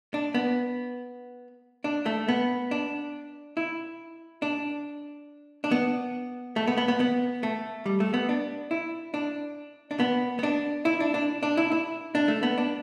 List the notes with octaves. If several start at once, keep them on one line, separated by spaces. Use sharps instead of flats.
D4
B3
D4
A3
B3
D4
E4
D4
D4
B3
A3
B3
B3
B3
B3
A3
G3
A3
B3
D4
E4
D4
D4
B3
B3
D4
E4
D4
D4
D4
E4
E4
D4
A3
B3
D4